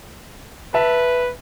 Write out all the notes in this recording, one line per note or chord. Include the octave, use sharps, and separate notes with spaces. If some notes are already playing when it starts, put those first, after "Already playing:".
B4 E5 A5